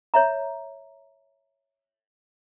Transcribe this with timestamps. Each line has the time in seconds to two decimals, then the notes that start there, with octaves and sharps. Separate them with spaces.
0.14 C#5 E5 A#5